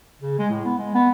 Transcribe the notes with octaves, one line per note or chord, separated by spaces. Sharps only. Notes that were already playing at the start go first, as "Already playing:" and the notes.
C#3
G#3
A2
B3
G#3
B3